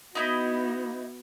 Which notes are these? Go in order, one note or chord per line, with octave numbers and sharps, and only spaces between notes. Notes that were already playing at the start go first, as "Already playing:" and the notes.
B3 D#4 E4 F#4 D#5